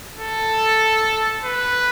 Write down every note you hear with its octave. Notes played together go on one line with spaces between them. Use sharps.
A4
B4